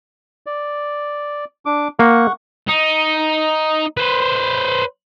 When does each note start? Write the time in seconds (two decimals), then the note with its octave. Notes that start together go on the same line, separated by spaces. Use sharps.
0.46 D5
1.66 D4 D6
1.99 A#3 F#5 C#6
2.68 D#4
3.97 B4 C5